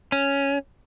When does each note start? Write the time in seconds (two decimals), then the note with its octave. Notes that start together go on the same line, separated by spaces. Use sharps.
0.12 C#4